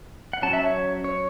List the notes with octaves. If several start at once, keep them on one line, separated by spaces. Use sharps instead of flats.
F#5
F#3 C#4 A5
E5
C#5
C#5